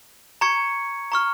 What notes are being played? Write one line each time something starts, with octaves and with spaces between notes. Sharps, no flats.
A#5 C#6 G#6 C#7
A#5 C#6 F6